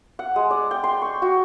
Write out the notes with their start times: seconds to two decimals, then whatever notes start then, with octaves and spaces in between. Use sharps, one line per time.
0.19 F#5
0.36 G#3
0.51 D5
0.71 G5
0.84 C6
1.02 C#6
1.22 F#4